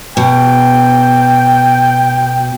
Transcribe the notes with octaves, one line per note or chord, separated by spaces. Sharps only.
B2 G5